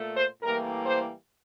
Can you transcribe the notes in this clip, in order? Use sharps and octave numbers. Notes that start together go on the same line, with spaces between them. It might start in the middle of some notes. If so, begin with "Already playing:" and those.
Already playing: A#2 A3
C5
A2 E3 G3 A#3 A#4
C5